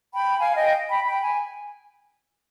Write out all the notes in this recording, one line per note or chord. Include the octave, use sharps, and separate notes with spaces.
G5 B5
F5 G#5
D#5 G5
G5 B5
G5 B5
G#5